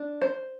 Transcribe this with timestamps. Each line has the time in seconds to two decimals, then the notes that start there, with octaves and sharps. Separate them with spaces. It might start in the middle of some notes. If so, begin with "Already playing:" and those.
Already playing: D4
0.22 C5